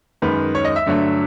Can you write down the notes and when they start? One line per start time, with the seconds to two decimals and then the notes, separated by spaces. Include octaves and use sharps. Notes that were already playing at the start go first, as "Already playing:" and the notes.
0.22 F#2 D#3 G#3 B4
0.55 C#5
0.65 D#5
0.76 E5
0.86 G2 D3 F#3 A3